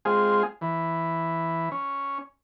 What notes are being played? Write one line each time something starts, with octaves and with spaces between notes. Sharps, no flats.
G#3 C4 F4 G#4
E3
C#4